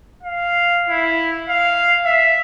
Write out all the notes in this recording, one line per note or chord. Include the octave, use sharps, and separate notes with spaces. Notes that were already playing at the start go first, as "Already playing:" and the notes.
F5
E4
F5
E5